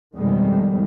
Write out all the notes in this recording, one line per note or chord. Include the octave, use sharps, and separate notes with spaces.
F2 B2 D#3 G3 G#3